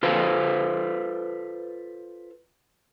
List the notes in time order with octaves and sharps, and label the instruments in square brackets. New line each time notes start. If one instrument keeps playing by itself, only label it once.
[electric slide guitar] F4 A4 B4 C5 F5